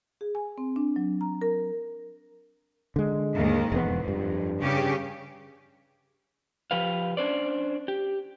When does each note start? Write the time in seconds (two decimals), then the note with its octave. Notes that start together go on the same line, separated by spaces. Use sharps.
0.21 G#4
0.35 G#5
0.58 C4
0.76 D4
0.96 F#3
1.21 A#5
1.41 A#4
2.96 D3 G#3
3.36 D#2 G#2 D#3
3.72 E1 F2 B3
4.08 G2
4.60 C#3 C#4 G4
6.71 F3 G4 B4 F5
7.17 C#4 D4 C5 D5
7.88 G4